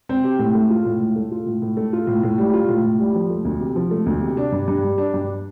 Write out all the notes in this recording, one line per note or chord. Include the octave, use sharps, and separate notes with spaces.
C4
G4
A2
A3
F4
A2
A2
A3
F4
A2
A2
A3
F4
A2
A2
G3
F4
A2
A2
G3
F3
A3
D2
C3
F3
A3
D2
C3
D4
G2
G2
G3
D4
G2